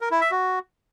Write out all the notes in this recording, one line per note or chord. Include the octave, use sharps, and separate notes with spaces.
A#4
E4
E5
F#4